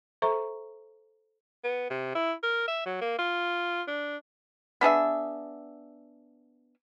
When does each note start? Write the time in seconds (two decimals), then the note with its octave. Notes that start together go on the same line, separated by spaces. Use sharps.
0.22 A4 C5 E5 A#5 C#6
1.64 B3
1.90 C3
2.15 E4
2.43 A#4
2.68 E5
2.85 F#3
3.01 A#3
3.19 F4
3.88 D4
4.81 B3 D4 G#4 E5